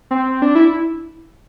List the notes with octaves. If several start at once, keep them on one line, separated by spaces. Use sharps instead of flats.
C4
D4
E4